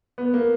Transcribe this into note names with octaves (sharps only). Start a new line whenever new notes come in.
B3
A#3